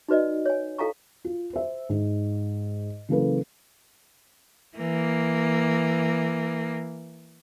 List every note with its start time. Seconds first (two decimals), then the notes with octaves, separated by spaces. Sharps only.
0.08 D#4 F#4 B4 D5 D#5
0.46 C#5 G#5
0.78 E4 A4 F5 G#5 A#5 C#6
1.24 F4
1.53 C5 E5
1.89 G#2
3.09 C#3 E3 F#3 A#3 A4 B4
4.77 E3 A#3